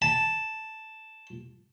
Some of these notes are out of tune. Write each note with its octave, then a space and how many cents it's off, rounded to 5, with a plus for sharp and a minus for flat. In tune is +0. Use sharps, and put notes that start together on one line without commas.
A5 +0